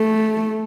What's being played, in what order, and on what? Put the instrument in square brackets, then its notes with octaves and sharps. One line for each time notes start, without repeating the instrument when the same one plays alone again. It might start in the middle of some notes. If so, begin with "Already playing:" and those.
Already playing: [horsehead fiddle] A3